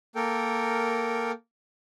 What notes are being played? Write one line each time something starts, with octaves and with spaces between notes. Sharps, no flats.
A#3 A4 A#4 G5